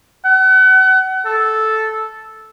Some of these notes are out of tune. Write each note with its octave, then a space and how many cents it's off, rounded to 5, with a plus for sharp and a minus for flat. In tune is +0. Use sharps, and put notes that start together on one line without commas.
F#5 +35
A4 -5